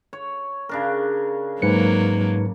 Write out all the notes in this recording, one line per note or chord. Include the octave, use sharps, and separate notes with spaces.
C#5
C#3 D4 A#4
G#2 F#3 A#3 B4 C#7